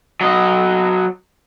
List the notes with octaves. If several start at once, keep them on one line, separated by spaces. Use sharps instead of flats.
F#3 D#5